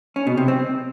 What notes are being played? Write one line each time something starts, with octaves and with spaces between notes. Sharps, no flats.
C#4
B2
C3
C4